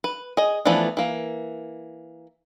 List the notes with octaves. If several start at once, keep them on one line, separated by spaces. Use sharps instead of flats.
B4
G#4 D#5
E3 F3 A3 B3 D4
E3 A#3